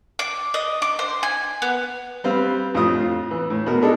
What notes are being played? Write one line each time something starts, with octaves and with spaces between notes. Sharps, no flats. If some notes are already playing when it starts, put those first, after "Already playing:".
D6
D#5
D6
C5
G#5
B3
G3 C4 B4 F5
F2 A2 F4 D#6
E3
A2
B2 A#4
G#3 D4 D#4 A4